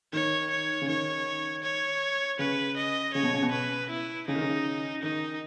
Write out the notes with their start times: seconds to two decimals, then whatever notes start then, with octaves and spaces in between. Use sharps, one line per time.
0.13 D#3 C#5
0.51 C#5
0.82 C#3
0.88 D#3 C#5
1.63 C#5
2.39 C#3 B4
2.76 D#5
3.14 C#3 C#5
3.23 B2
3.33 C#3
3.42 B2
3.52 B4
3.90 E4
4.27 C#3 D#4
4.35 D#3
4.41 C#3
5.03 D#3 D#4